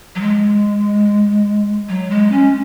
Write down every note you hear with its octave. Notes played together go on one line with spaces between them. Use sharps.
F#3
G#3
F#3
G#3
C#4